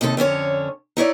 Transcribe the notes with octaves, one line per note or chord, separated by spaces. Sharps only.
D#2 C3 D#4 F4 A4
F2 D3 C#4 C#5
D#4 E4 C#5 D5